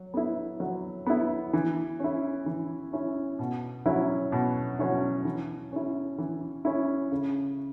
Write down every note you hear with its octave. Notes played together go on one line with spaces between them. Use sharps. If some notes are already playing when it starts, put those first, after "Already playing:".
Already playing: F#3
B3 E4
F#3
B3 E4
E3
C#4 E4
E3
C#4 E4
B2
F#3 C#4 E4
B2
F#3 C#4 E4
E3
C#4 E4
E3
C#4 E4
C#3